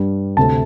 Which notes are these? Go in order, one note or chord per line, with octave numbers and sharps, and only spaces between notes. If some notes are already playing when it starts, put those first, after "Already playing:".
Already playing: G2 G3
D2 C3 A3 A5